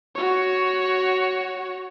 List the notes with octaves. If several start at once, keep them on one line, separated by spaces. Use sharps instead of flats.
F#4 C#5